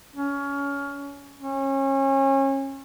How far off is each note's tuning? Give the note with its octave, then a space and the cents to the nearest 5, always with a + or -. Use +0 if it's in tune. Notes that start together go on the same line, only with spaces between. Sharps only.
C#4 +20
C#4 -30